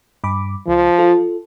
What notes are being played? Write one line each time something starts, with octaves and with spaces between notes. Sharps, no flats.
G2 B5 D6
C#2 F3
F4 A4